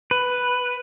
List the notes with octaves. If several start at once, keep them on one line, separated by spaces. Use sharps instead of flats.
B4